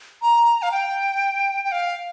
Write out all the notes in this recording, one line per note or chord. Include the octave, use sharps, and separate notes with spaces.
A#5
F5
G5
G5
F5